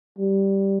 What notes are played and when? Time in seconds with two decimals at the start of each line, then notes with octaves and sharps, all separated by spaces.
0.18 G3